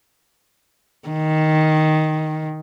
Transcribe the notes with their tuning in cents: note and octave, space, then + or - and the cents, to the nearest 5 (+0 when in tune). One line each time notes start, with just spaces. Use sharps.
D#3 +5